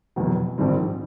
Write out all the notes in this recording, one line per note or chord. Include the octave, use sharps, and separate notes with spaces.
F1 E2 B2 F#3
A#1 G#2 D#3 G3 C4